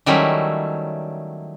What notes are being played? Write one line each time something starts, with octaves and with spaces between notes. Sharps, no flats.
D#3 F#3 G3 A3 C#4 E4